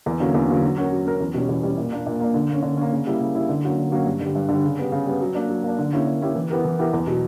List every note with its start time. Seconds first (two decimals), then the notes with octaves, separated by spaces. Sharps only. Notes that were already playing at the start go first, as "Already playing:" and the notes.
0.06 E2
0.20 D3 F#3 A#3 C#4
0.34 E2
0.48 D3 F#3 A#3 C#4
0.63 F#3
0.77 C#4 F#4 A#4
0.92 F#3
1.06 C#4 F#4 A#4
1.20 E2
1.34 B2 G3 C#4
1.49 E2
1.63 B2 G3 C#4
1.78 A#2
1.92 A#3 D4
2.06 A#2
2.20 A#3 D4
2.34 D3
2.49 A#3 C#4
2.63 D3
2.77 A#3 C#4
2.92 C#3
3.07 G3 A#3 E4
3.21 C#3
3.35 G3 A#3 E4
3.49 D3
3.64 F#3 A#3 C#4 F#4
3.78 D3
3.91 F#3 A#3 C#4 F#4
4.06 G2
4.20 D3 G3
4.35 G2
4.49 D3 G3
4.64 C#3
4.79 G3 B3
4.92 C#3
5.06 G3 B3
5.21 F#3
5.35 A#3 D4
5.49 F#3
5.64 A#3 D4
5.79 D3
5.93 A#3 C#4 E4 G4
6.06 D3
6.21 A#3 C#4 E4 G4
6.35 E3
6.50 B3 E4 G4 A#4
6.65 E3
6.78 B3 E4 G4 A#4
6.93 E2
7.07 B2 F#3